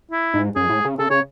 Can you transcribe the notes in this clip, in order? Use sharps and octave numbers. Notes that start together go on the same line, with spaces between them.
E4
G#2
F#2 G#4
A2
C#3
C#3 A4
C#3 C#5